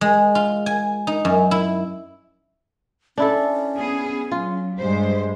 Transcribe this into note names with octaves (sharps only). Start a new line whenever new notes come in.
G#3
F4
G#5
D#4
F#2
E4
C#4 D4 E4 A4
B3 G#4
F#3 F4
G2 G3 G#3 C5